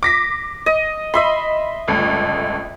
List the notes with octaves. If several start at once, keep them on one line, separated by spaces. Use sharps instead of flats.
D6 A#6 B6
D#5
D#5 E5 B5 C6
G1 C#2 A3